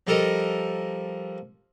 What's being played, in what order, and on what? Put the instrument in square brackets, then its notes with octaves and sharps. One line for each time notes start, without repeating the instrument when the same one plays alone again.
[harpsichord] F3 G3 A4 A#4 D#5